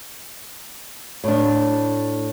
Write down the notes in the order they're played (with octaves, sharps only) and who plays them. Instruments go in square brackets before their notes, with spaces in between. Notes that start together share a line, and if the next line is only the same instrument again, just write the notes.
[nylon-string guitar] A2 D4